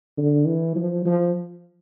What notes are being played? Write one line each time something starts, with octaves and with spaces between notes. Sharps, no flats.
D3
E3
F3
F3